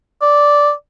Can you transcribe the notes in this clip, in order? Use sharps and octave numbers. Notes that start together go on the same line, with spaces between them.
D5